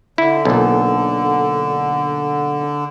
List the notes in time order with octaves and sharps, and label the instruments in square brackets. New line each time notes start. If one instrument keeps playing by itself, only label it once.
[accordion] D3 [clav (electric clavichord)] E4
[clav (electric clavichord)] B1 A#2